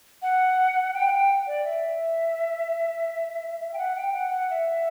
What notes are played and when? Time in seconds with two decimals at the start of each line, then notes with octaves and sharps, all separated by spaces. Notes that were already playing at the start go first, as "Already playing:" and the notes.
0.22 F#5
0.93 G5
1.07 F#5
1.12 G5
1.47 D5
1.64 E5
3.73 G5
3.78 F#5
3.96 G5
4.14 F#5
4.31 F#5
4.50 E5